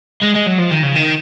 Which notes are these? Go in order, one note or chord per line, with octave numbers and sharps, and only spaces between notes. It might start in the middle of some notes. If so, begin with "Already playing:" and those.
G#3
G#3
F#3
F3
D#3
C#3
D#3